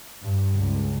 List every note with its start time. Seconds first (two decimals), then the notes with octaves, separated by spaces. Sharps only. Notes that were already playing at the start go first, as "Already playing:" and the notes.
0.24 G2
0.57 C#2